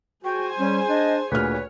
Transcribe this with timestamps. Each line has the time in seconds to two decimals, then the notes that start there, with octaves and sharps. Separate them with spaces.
0.24 F#4 G#4 C5 G5 G#5
0.58 G3 C#4
0.88 D4 D#5
1.31 D2 A#2 G#4 B4 C#5 F6